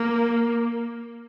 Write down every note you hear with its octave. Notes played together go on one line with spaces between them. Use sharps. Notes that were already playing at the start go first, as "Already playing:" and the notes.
Already playing: A#3